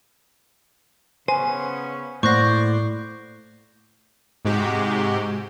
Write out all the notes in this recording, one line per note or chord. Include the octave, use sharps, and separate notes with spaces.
C#3 B3 C#4 C5 G#5
A2 A#3 C5 D5 F#5 C#6 F#6 A#6
G#2 C3 G#3 F#4 G4